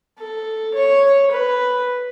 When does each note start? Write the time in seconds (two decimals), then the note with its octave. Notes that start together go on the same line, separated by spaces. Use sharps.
0.18 A4
0.74 C#5
1.31 B4